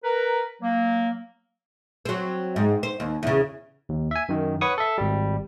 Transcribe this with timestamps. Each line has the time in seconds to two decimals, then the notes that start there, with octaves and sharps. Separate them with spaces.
0.04 A#4 B4 A#5
0.61 F#3 A#3
2.05 F#3 C4
2.56 G#2
2.83 C5
3.00 D#2
3.23 E2 C#3
3.89 D#2
4.11 E5 G#5
4.29 F#2 D#3
4.61 B4 C#5 F#5 C#6 D#6
4.78 A4 E5
4.98 G#1 G3